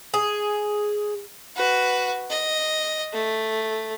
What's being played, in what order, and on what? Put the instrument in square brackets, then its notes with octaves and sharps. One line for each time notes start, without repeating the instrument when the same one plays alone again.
[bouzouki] G#4
[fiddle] F#4 B4
D#5
A3